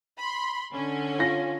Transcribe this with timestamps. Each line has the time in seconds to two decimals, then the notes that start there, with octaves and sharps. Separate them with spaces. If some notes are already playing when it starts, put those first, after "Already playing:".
0.19 B5 C6
0.73 D3 C#4
1.19 F4 A#6